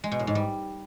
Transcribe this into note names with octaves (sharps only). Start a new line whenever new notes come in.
G#3
B2
A2
G#2
G3